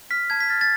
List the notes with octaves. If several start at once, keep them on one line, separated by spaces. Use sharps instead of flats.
F6 B6
A5 G#6
B6
F6 A6
A6